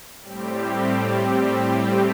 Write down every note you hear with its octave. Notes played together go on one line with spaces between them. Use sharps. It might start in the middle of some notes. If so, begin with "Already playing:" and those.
A2 G3 C4 G4